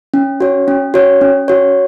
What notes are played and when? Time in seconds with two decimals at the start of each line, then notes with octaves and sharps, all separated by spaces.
0.14 C#4
0.40 F#4 C#5
0.68 C#4
0.94 F#4 C#5
1.21 C#4
1.48 F#4 C#5